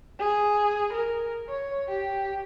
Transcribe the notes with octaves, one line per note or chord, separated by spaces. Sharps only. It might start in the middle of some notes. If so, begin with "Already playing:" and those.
G#4
A#4
C#5
G4